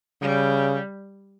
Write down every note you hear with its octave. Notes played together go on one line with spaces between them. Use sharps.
C#3 G3